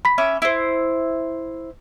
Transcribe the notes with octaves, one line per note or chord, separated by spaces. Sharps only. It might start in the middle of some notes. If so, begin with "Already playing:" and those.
B5 B6
C#4 E5 D6
E4 C5